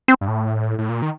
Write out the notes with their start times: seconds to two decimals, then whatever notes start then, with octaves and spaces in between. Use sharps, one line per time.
0.08 C4
0.21 G2
0.28 A2
0.78 A2
0.89 A#2
1.02 D#3